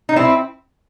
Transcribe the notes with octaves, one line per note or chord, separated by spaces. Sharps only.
D#4
C4 E4